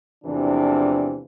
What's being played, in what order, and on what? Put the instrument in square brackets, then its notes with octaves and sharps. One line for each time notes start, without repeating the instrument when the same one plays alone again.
[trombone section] E2 C3 E3 F3 A3 D4